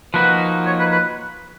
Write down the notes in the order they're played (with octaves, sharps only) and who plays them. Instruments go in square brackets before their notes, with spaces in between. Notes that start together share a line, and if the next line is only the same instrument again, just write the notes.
[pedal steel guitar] F3 A#3 D#4 F#4 [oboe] B4
[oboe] C#5
B4
B4